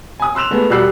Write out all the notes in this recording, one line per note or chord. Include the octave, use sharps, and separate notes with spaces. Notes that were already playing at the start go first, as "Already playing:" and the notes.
G#5 D#6
C6 E6 F#6 E7 F7
G#3 A3 B3
E1 G3 F#4 E6 F#6 C7